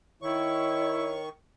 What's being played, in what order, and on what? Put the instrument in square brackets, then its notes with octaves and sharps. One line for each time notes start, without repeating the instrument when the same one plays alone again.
[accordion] D#3 C#6 [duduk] E4 [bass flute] C#5